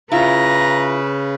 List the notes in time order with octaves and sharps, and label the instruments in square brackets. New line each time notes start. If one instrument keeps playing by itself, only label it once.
[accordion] C#3 [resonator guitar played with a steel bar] E4 F4 [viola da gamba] B4 [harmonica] A#5